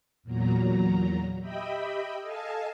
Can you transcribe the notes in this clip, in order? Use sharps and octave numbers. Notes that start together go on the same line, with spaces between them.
E2 A#2 F#3 A#5
G4 D#5 E5 G5 B5
A4 D#5 F5 G#5 A5